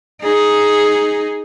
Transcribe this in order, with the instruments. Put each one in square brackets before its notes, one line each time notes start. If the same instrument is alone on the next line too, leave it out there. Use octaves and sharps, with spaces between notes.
[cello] D#4 G#4